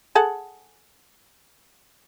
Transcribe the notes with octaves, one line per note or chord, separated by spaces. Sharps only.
G#4 A4 F#5